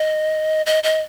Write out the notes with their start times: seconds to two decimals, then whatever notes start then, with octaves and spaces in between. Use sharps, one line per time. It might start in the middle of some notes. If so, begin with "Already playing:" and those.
Already playing: D#5
0.66 D#5
0.83 D#5